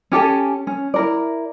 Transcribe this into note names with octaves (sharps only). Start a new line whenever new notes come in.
C#4 G4 A4 G#5
C#4
E4 A#4 D5